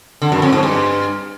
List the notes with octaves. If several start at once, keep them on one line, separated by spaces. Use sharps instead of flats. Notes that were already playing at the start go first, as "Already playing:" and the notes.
D3
F#2
F2
G#2
G2